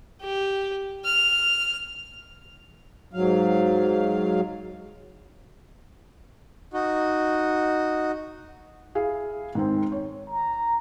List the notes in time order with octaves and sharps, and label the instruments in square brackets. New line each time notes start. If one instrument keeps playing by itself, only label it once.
[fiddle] G4
F6
[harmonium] G#2 F#3 F5
[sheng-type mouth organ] D#4 F#4
[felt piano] E4 G#4 F5
G#2 D#3 C4
C#5
[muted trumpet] A#5